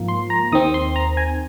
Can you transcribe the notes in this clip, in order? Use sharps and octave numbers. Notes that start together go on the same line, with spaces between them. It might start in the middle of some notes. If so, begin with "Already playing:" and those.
Already playing: G#2 F3 A#3
C6
A#5
D#2 D#3 C4 D#6
C6
A#5
G#5